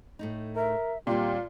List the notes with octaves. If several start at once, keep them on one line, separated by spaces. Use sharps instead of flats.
A2 A3 D#4
A#4 E5
D#2 A#2 G3 C4 F4 G4